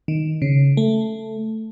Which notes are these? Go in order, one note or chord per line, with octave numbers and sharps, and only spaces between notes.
D#3
C#3
A3